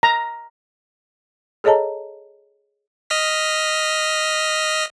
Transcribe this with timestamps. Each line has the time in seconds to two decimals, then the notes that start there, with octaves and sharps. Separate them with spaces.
0.03 A#5
1.64 G#4 A4 C#5 D#5 A5 A#5
3.10 D#5 F6 B6